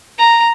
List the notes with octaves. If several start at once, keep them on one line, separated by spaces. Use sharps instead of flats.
A#5